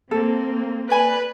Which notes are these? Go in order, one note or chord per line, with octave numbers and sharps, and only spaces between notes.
A#3 C4 A4
B4 D5 G#5 B5